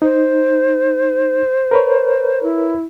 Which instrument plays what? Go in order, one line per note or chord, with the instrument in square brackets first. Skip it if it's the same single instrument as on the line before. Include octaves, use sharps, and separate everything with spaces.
[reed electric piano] D#4 [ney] C5
[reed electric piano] A#4 B4 C#5
[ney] E4